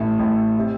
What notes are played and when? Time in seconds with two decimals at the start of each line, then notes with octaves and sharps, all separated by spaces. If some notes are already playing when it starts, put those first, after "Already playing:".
Already playing: A1 A2 A3
0.19 A1 A2 A3
0.58 C3